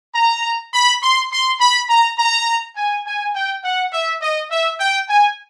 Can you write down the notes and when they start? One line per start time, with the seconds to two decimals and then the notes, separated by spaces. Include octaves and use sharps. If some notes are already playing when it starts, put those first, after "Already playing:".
0.15 A#5
0.73 B5
1.03 C6
1.32 C6
1.60 B5
1.90 A#5
2.19 A#5
2.76 G#5
3.06 G#5
3.35 G5
3.64 F#5
3.93 E5
4.21 D#5
4.50 E5
4.79 G5
5.09 G#5